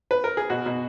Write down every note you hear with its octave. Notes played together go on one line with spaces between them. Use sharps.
B4
A#4
G#4
B2 F#4
B2